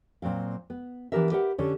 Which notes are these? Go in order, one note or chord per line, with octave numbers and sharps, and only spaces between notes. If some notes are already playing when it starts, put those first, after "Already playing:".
A#2 F#3 C4 F5
B3
E3 B3 D4 G4 A#4 E5
G4 A#4 B4 E5 F#5
D3 C#4 G4 A4 C#5